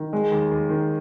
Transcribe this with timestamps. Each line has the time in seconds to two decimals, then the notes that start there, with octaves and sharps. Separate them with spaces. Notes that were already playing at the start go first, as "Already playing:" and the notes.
Already playing: D#3
0.13 G#3
0.31 D#2
0.51 D#2
0.69 D#3